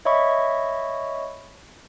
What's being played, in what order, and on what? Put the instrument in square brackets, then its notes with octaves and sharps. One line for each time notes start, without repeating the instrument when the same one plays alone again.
[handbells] C#5 D#5 E5 B5 C#6